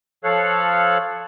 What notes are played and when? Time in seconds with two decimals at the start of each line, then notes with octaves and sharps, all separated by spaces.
0.24 F3 A4 C#5 F5 F#6